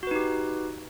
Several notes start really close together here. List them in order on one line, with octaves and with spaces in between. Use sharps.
F#4 B4 D#4 G4